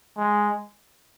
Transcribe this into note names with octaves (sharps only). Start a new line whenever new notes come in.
G#3